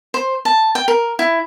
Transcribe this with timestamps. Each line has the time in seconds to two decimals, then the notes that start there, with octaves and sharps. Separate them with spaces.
0.14 C5
0.45 A5
0.75 G5
0.88 A#4
1.19 E4